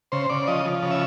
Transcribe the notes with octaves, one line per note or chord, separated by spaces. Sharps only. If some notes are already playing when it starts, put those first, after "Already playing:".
C#3 C5
C#3 D5
F3 D#5
F3
C#3
E5